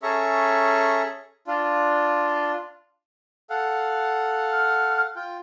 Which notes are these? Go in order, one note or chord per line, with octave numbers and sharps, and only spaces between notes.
C#4 G#4 A4 E5 A#5 C#6
D4 F4
A4 F5 F#5
F6
F4 G5